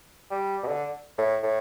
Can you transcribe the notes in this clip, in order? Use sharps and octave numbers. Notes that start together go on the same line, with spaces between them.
G3
B2
D3
A2
A2